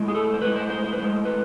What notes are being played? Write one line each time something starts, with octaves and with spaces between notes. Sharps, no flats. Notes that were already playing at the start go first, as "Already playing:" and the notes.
Already playing: A2 G#3
G#4
A4
C5
A2 G#3 B4
C5
C5
C5
B4
A2 G#3 C5
B4